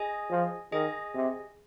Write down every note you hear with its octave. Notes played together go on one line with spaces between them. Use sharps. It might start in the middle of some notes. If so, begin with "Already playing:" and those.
Already playing: G#4 D#5 G#5
F3
D#3 G#4 D#5 G#5
C3